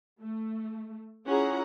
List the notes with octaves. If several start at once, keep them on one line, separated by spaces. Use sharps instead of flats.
A3
C#4 E4 F4 G#4 F#5 A#5